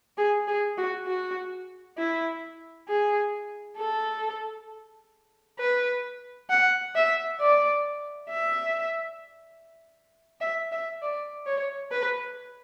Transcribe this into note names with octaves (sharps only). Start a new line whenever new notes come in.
G#4
G#4
F#4
F#4
E4
G#4
A4
B4
F#5
E5
D5
E5
E5
E5
D5
C#5
B4